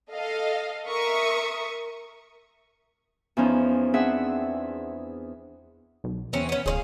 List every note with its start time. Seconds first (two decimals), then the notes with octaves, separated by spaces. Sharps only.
0.12 A4 D#5 F5
0.89 A#4 E5 C#6 D#6
3.37 E2 F3 C#4 D#4
3.94 C4 D4 G#4 E5 F#5
6.04 B1
6.33 E2 E3 C4 C#4
6.49 B3 C#4
6.66 D1 G#4 C5 F5